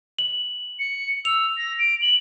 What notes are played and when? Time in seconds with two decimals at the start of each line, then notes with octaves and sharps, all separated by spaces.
0.19 F#7
0.79 C#7
1.25 E6 F7
1.58 A#6
1.79 D7
2.02 F#7